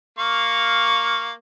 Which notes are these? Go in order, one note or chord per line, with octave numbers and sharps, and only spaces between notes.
A#3 F5 C#6